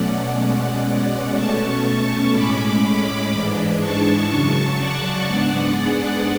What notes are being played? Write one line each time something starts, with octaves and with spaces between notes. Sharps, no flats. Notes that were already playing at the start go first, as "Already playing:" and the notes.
Already playing: B2 F#3 A3 C#4 D5 F#5
B2 G#3 C#4
B2 A3 C#4 A5 C#6
A2 G#3 C#4 B5 D6
G#2 E3 G#3 D4
A5 C#6
F#2 C#3 F#3
D5 F#5
G#2 G#3 B3 D4
G#4